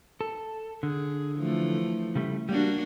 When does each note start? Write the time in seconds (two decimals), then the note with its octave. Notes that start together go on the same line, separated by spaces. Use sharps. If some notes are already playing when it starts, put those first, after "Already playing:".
0.21 A4
0.83 D3 G#4
1.36 E3 F3 A3
2.15 C#3 G3 A3
2.49 G3 A#3 D4 F#4